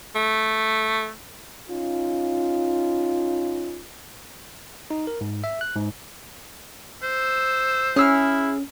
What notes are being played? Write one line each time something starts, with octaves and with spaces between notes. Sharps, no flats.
A3
C#4 D#4 F4
D#4
A#4
G#2
E5
F#6
G#2
C5 E6
C#4 E4 G#4 E6 F6